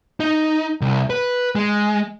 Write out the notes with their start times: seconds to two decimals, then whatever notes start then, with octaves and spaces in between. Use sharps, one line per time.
0.20 D#4
0.81 C2
1.10 B4
1.55 G#3